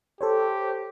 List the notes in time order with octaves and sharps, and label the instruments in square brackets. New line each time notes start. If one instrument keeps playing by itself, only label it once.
[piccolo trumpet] G4 [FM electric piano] A4 C5 C#5